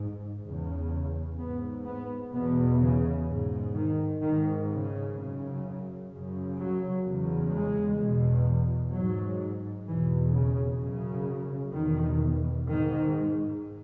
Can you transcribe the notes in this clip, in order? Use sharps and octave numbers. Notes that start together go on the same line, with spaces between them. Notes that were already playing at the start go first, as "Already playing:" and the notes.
Already playing: G#2
E2 C#3
G#2 B3
B3
E2 B2 B3
C#3
G#2
D#3
G#2 D#3
C#3
F#2 C#3
F#2 C#3
F#3
E2 C#3
G#3
E2 B2
G#2 F#3
E2 B2 E3
C#3
F#2 C#3
E2 B2 D#3
G#2 D#3